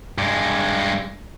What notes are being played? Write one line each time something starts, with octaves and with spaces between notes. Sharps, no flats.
G2 G#3